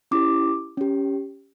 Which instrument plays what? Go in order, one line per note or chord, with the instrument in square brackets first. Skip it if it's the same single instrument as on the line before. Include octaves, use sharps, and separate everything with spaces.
[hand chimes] C#4 E4 G4 D6
C#4 G4